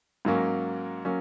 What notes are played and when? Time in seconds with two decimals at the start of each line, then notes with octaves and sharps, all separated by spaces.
0.25 G#2 F#3 A#3 C#4
1.05 F#3 A#3 C#4